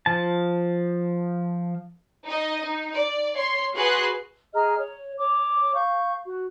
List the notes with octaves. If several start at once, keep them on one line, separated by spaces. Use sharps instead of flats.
F3 A5
D#4 D#5
D#4
D5
C#5 C6
F#4 G#4 B4 F#5 C6 F#6
G#4 D#5 A#5 F6
C#5
C#5 D6
F5 C#6 G6
F#4